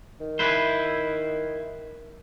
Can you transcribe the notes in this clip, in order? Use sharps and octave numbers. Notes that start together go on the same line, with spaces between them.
D#3
E4 B4 C5